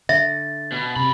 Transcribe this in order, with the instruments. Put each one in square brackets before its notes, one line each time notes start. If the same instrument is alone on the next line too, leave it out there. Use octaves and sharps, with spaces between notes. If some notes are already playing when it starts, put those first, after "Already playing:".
[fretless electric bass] D3 [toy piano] E5 [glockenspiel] A6
[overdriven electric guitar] B2
[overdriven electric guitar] F#2 B5 [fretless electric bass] C3